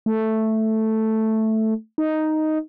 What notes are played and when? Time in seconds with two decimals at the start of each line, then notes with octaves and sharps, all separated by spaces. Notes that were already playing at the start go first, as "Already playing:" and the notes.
0.06 A3
1.98 D#4